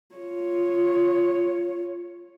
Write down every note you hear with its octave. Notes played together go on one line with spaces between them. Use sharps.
F4 C#5